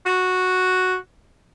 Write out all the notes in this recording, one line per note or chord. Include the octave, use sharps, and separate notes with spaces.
F#4